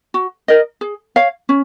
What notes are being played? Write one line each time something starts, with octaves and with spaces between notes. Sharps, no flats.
F#4
A#4 D#5
G#4
C#5 F5
C#4